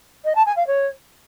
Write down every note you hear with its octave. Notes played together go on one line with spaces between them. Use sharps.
D#5
A5
G#5
F5
C#5